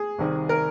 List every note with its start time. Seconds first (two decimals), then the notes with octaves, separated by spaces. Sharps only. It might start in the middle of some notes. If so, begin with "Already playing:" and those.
Already playing: G#4
0.19 C2 C3 D#3
0.49 A#4